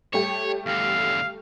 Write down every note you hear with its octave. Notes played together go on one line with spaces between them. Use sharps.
G3 A3 G4 C#5
E2 D3 F5